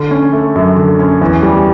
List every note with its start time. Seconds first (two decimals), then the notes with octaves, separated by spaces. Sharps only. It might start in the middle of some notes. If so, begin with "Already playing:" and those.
Already playing: D3
0.11 C#4
0.33 A3
0.55 F#2
0.77 D3
0.99 C#4
1.21 E2
1.43 G3